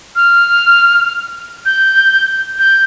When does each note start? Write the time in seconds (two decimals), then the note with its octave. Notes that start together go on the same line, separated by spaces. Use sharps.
0.16 F6
1.66 G6
2.59 G6